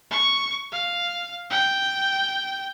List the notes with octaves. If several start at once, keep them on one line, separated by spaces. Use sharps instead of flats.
C#6
F5
G5